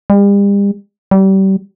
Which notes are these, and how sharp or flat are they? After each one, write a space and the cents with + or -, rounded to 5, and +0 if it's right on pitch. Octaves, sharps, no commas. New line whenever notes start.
G3 +40
G3 -30